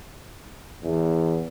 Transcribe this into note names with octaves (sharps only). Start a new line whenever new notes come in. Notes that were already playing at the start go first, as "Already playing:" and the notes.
E2